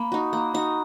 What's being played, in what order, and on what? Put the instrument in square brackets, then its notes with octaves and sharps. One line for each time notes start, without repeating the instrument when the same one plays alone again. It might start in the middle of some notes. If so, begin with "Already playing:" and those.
Already playing: [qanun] A#3 [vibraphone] B5
[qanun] D#4 F#4
[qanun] A#3 [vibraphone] A#5
[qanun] D#4 F#4 [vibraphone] A#5